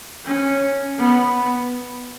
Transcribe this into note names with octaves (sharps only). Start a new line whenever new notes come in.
C#4
B3